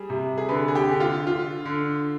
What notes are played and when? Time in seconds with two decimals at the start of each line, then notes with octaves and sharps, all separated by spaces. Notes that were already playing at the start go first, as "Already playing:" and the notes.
Already playing: G3 G#4
0.10 C3
0.38 G#4
0.49 D3 B4
0.68 G#4
0.75 G4
0.88 D3
1.00 F4
1.27 D3 F4
1.65 D3